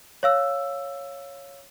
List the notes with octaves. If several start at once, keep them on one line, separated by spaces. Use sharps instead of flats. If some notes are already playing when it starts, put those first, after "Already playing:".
C#5 F5 E6